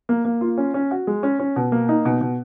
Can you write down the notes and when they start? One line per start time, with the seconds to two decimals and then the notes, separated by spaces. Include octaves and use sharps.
0.09 A#3
0.25 A#3
0.41 F4
0.58 C#4
0.74 C#4
0.91 F#4
1.07 G#3
1.23 C#4
1.39 C#4
1.56 B2
1.72 A#3
1.89 D#4
2.05 B2
2.21 B2